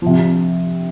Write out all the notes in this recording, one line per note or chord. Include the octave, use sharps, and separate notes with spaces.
C3 F3